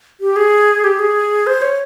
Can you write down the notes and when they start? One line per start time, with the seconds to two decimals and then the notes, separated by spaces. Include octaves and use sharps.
0.20 G4
0.36 G#4
0.84 G4
0.99 G#4
1.47 C5
1.62 C#5